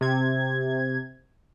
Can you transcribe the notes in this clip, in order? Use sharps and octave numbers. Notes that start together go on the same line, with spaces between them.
C3 G#6